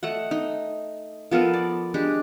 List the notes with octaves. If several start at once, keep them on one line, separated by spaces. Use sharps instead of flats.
A3 D#5 F#5
D#4
F3 B3 A4 A#4
D5
G#3 D4 G4